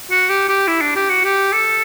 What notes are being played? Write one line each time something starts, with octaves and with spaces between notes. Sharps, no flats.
F#4
G4
G4
E4
D4
G4
F#4
G4
A4